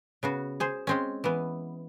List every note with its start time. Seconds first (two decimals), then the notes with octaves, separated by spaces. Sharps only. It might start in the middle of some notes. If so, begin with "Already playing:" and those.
0.23 C#3 B3 F#4
0.60 G#4 C5
0.87 G#3 C4 C#4
1.24 E3 B3